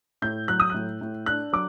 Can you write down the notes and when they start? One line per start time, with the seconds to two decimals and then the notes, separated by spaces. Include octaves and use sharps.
0.22 A2 G6
0.48 F#3 F#6
0.60 D#6
0.70 A2 F#6
1.01 A2
1.26 D4 F#6
1.53 F#3 D6